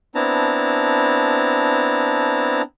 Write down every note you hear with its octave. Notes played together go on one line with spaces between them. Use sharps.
B3 C4 D4 E4 A5 A#5